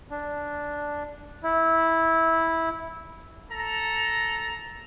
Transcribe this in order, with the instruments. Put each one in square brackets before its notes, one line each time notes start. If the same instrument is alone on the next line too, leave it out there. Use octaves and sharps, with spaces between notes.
[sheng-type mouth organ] D4
E4
[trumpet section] A4 A#5